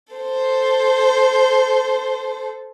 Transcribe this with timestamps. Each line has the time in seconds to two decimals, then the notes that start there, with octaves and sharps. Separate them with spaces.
0.13 A4 C5